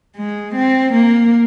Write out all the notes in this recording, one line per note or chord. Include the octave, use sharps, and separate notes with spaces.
G#3
C4
A#3